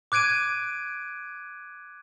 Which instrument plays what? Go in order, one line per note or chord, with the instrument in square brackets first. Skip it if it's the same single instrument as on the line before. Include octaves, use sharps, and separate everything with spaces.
[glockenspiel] D6 F#6 G#6 D7 D#7